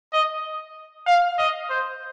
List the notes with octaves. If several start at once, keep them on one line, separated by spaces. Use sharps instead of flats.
D#5
F5
D#5
C5